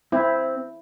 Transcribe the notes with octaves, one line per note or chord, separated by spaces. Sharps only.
C4 E4